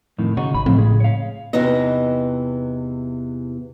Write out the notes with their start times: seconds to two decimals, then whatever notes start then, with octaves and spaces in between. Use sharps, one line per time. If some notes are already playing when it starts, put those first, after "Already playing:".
0.18 F2 A2 D#3
0.37 C#3 D#4 F#4
0.55 G#1 B5
0.66 A2 F3 C4
0.79 C#2 G#4
1.00 C#5 F5
1.53 E2 C3 E3 B3 D#4 D#5